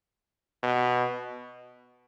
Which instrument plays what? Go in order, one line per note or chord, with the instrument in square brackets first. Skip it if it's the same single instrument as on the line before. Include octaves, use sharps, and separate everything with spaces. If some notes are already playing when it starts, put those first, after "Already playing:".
[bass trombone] B2